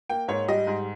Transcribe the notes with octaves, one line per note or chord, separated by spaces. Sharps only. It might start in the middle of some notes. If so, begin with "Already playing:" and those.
A#3 G5
G#2 C#5
G3 D#5
G#2